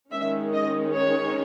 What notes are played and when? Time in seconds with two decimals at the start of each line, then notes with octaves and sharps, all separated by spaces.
0.11 D#3 G#3 C#4 E5
0.53 D#5
0.95 C#5